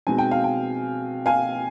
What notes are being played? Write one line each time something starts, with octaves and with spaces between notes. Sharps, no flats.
B2 G#3 C4 D#4 G#5
G5
F5
G5
F5 G#5